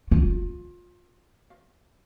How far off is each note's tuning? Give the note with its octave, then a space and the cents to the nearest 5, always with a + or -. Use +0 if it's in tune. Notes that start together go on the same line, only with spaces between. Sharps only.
F4 +25